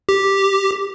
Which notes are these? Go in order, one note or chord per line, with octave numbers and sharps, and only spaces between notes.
G4